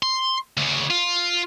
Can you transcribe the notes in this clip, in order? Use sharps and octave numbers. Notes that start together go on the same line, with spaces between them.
C6
D2 C#3
F4